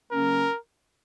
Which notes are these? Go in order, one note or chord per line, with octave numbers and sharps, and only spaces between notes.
C#3 F#3 A#3 C#4 A#4